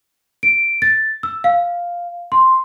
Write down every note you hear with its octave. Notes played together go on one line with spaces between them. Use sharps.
D7
A6
E6
F5
C6